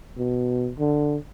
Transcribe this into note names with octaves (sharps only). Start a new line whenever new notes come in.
B2
D3